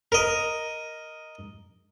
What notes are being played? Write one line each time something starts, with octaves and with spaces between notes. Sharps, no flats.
A#4 D#5